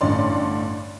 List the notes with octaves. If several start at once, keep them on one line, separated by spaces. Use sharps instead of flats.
A1 G2 D3 C#4 D5 C6